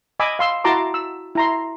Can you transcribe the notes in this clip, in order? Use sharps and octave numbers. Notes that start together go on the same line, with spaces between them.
D#5 G#5 B5 D6 E6
F5 C6 E6
E4 F#4 A5 A#5 C6 D6
E6
E4 A#5 C6